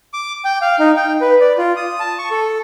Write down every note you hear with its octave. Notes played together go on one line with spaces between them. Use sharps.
D6
G5
F5
D#4
G5
B4
D5
F4
D#6
A5
C#6
A4